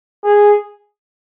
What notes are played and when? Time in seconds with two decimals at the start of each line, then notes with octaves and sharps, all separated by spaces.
0.24 G#4